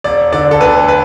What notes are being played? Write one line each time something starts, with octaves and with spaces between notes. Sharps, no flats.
E1 D5
D3 D5
A4
D2 B4
B4